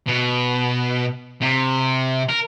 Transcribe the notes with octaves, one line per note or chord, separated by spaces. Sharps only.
B2
C3
A#4